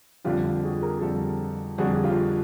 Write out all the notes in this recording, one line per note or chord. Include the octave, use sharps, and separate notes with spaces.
F2 D3 G3 F4 G4
F4 G4
F#4 G#4
G#4 A#4
F2 D3 G3 G4 A4
F2 D3 G3 F#4 G#4
F4 G4